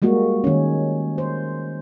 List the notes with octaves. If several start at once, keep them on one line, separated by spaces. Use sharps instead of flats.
G3 G#3 A#3 F#4
D#3 C#4
C5